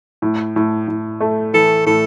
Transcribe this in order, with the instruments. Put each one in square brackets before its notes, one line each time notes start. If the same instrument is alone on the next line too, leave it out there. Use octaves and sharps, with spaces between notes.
[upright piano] A2
A2
A2
A3
[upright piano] E3 [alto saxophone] A4
[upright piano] A2 [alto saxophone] A4